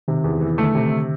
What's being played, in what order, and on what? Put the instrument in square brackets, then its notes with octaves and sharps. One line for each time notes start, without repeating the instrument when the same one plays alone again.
[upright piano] C3 [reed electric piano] D#3
[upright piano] E2
E3
[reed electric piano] D3 [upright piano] A3
[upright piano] C3